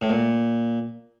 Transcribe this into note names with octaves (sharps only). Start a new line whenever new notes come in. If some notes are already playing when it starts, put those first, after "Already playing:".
A2
A#2